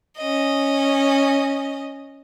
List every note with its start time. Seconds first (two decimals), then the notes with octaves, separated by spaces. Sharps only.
0.18 C#4 D#5